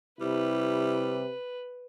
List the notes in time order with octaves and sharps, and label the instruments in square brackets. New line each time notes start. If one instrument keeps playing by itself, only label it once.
[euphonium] C3 [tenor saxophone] G3 [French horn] E4 [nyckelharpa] B4